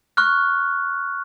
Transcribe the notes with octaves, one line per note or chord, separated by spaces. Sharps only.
C#6 F6 F#6